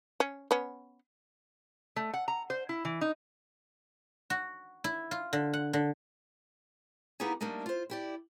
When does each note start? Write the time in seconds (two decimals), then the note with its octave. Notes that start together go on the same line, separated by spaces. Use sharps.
0.20 C#4
0.51 B3 C#4
1.96 A3
2.14 F#5
2.28 A#5
2.50 C5
2.69 E4
2.85 E3
3.01 D#4
4.30 F#4
4.84 E4
5.11 F4
5.33 D3
5.54 F#5
5.73 D3
7.20 A#3 B3 D#4 E4 G4 G#4
7.41 G3 A3 A#3 D4 D#4
7.66 F4 C5
7.90 E4 G4 D5